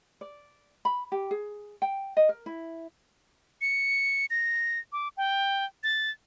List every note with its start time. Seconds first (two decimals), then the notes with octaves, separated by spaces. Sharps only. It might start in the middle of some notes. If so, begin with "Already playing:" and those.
0.21 D5
0.85 B5
1.12 G4
1.31 G#4
1.82 G5
2.17 D#5
2.29 A#4
2.46 E4
3.61 C#7
4.30 A#6
4.92 D6
5.17 G5
5.84 A6